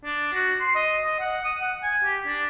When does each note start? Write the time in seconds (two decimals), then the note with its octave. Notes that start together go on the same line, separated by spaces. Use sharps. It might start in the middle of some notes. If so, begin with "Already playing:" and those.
0.05 D4
0.33 F#4
0.61 C6
0.75 D#5
1.05 D#5
1.20 F#5
1.45 D#6
1.61 F#5
1.83 G#5
2.04 G4
2.27 D4